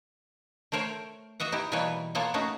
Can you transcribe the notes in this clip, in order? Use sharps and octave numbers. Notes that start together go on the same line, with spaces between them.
A3 A#4 C5 C#5 G5
F#4 D#5 E5 F#5
D#4 E4 G4
B2 E3 G3 A#3 B4 C#5
A#3 B3 F4 A4 C#5 F#5
A3 C#4 D#4 F#4